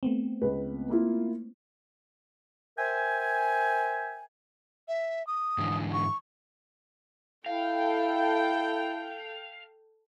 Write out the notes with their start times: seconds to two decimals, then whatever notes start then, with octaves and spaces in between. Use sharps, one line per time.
0.03 A3 B3 C4
0.41 C#2 B4
0.89 A#3 E4 F4
2.78 A#4 C5 E5 G5 G#5
4.88 E5
5.27 D#6
5.58 G#2 D3 E3
5.93 C#6
7.46 E4 A4 F5 G5